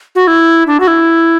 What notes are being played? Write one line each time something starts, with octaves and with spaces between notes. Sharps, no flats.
F#4
E4
D4
F#4
E4